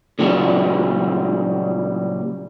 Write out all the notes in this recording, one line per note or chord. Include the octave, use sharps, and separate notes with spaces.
A#2 C#3 E3 F#3 G3